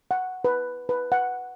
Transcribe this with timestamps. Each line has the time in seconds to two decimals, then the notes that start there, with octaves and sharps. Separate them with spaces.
0.11 F#5
0.45 B4
0.89 B4
1.12 F#5